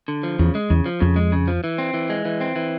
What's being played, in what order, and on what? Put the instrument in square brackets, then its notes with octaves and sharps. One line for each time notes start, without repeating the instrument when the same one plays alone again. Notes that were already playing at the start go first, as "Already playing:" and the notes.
[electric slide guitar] D3
F3
[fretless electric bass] E2 [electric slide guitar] C#3
[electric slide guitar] G#3
[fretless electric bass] E2 [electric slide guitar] C#3
[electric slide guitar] F3
[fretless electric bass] F2 [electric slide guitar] C#3
[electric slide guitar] G#3
C#3
F3
E3
C4
E3
G#3
E3
C4
E3